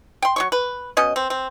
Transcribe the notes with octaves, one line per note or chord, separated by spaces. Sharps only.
G5 C6
F#3 C#5 C#6
B4
B2 C#4 D#5
C4
C4